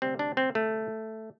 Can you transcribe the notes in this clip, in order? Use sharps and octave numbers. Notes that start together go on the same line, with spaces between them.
D2 C3 G3 C4
D4
C4
A3